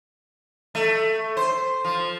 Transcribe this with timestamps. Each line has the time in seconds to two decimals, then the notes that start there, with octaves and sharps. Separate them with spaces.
0.75 A3
1.37 C5
1.84 F3